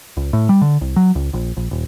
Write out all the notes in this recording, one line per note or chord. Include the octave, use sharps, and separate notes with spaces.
C#2
A2
G3
D3
C2
F#3
C#2
A#1
A#1
D#1